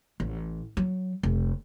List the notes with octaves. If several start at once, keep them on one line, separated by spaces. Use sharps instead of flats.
A1
F#3
F1